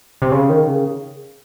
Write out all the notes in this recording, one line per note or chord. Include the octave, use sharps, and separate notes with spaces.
C3
C#3
D#3
C#3